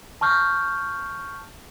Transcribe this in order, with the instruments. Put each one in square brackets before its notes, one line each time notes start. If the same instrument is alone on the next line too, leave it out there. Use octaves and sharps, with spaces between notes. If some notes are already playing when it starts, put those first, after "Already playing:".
[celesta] A5 C#6 F6 G6